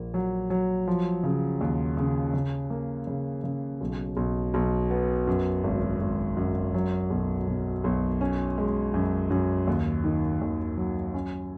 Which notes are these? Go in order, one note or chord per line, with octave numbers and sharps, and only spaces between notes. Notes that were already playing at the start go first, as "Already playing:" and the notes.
Already playing: A#1 A#3
F#3
F#3
F3
C#3
D#2
C#3
C#3
A#3
C#3
C#3
B1
B1
B1
B3
F#2
G#1
G#1
F#2
F#3
B1
B2
B1
C#4
G#3
F#2
F#2
D#2
D#3
D#2
F#3
C#4